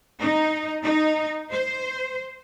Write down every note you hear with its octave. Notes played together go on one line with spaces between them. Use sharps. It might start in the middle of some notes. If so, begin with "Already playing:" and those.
D#4
D#4
C5